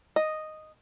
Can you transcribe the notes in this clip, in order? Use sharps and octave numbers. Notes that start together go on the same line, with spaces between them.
D#5